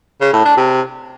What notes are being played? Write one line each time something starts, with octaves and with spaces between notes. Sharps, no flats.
C#3
A2
D4
C3